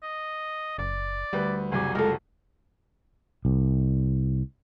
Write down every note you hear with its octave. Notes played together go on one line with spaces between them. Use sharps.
D#5
F#1 D5
D2 G3 B4 F#6
F#1 C2 G#5 D6
G#3 F4 A4 A#4
C2